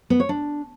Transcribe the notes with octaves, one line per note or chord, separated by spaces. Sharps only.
B3
C#5
D4